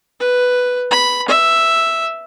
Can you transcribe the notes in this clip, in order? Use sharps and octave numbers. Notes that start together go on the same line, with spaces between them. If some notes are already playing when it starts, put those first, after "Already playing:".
B4
B5
E5